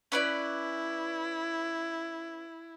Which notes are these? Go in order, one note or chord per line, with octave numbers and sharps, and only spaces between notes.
C#4 E4 B4 D5